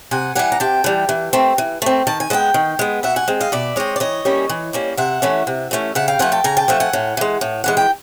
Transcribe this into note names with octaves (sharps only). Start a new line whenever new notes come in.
C3 F#5 G#5
E3 G3 F#5 G#5
A#5
C3 G5 A5
E3 G3
E3
A3 C4
E3
A3 C4
D#3 A5
G#5
G#3 B3 G5 A5
D#3
G#3 B3
B2 E5 F#5
F#5 G#5
G#3 C4
D#5 F5
B2 D5 E5
G#3 C4 C#5 D#5
D5
E3 C#5 D#5
G3 A#3 C#4
E3
G3 A#3 C#4
C3 E5 F#5
E3 A3 C#4
C3
E3 A3 C#4
C#3 E5 F#5
F5 G5
F3 A3 F#5 G#5
G5 A5
C#3 G#5 A#5
G5 A5
F3 A3 E5 F#5
F#5 G#5
A2
E3 G#3
A2
E3 G#3 F#5
G5